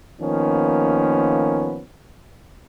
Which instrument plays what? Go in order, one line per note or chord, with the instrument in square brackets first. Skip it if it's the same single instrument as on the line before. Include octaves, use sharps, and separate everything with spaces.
[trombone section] D#3 F3 A#3 B3 C#4